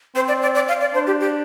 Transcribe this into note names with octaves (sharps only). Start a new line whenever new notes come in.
C4 C5
D5
D5
D5
F5
D5
D4 C5
G4
G4